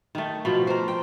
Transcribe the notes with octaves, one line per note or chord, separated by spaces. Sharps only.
D#3 A3
B2 F3
A#4 C5
G5